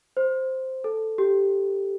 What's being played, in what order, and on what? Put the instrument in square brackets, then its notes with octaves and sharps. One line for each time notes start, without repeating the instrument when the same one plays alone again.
[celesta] C5
A4
G4